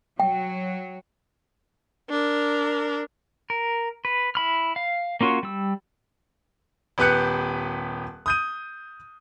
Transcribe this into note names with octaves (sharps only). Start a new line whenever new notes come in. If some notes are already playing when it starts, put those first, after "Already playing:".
F#3 G5
D4 A#4
A#4
B4
E4 B5 F6
F5
A#3 C#4 F4 F#4 C#5
G3 E6
D#1 B3 G4 B4 F#6 C#7
D#6 G6 D#7